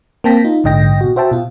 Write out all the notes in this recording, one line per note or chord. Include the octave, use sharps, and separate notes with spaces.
A#3 C4 G5 A5 A#6 B6
D#4 F4
A#1 G#2 D3 D#5 G5 A#6
B2 F#4
F#4 C5 E5 G5 A5
B2 F4